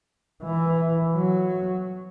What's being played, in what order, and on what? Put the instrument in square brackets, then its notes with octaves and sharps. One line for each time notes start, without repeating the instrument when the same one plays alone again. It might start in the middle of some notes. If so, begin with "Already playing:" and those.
[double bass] E3
F#3